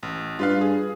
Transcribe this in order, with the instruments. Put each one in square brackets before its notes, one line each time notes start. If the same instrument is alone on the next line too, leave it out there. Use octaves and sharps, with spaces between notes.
[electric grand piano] A1
[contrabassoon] G2 [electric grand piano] F4 B4 F5
[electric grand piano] G#4